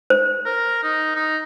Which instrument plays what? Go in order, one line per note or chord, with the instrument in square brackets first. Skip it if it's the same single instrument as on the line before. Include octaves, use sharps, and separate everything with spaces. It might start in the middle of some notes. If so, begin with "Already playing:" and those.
[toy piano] C5
[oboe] A#4
D#4
D#4